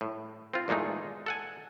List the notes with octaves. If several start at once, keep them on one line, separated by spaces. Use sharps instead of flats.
A2
C4 F4
E2 A#2 G#3 A3 D#4
A4 F#5 G#5